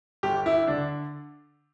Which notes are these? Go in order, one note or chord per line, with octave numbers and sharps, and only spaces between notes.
G1 G4
E4
D3 D4